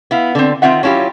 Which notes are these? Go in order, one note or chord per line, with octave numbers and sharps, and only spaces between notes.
B3 E4 F5
D3 C4
D#3 G#3 C4 F4 E5 F#5
F#3 C#4 E4 F4 G4